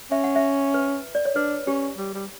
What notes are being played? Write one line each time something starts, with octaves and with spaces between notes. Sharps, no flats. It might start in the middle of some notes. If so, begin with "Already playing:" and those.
C#4 E5
F#5
E5
B4
D5
C#5
D4 B4
C#4 G4
G3
G3